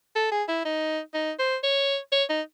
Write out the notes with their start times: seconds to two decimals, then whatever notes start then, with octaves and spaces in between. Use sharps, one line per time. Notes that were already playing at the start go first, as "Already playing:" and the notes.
0.16 A4
0.32 G#4
0.48 E4
0.65 D#4
1.14 D#4
1.39 C5
1.63 C#5
2.12 C#5
2.30 D#4